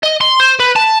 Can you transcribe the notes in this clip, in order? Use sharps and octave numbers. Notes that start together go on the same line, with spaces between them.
D#5
C6
C5
B4
A5